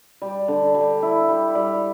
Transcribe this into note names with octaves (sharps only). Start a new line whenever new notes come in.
G3
D3
G3
E4
G3
G3